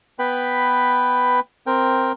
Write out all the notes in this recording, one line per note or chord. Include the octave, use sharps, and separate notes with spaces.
B3 B4 G5 B5
C4 A#4 G5